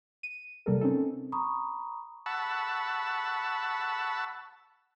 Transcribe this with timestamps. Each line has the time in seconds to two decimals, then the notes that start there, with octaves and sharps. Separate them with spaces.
0.23 D#7
0.66 C3 G3 A#3 A4 A#4
0.81 C4 C#4 D#4 A4
1.32 A#5 B5 C#6 D#6
2.26 F#5 A5 B5 C#6 E6